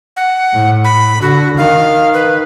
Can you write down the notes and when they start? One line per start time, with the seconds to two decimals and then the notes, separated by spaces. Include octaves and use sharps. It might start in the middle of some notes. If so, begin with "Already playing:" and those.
0.17 F#5
0.53 A2
0.84 B5
1.22 D3 F#4
1.57 D#3 F5
2.13 B4